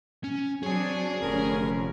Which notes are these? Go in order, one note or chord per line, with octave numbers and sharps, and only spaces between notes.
C#4
F#3 C4 D4 G#4 C#5 G#5
F1 D3 C#4 A#4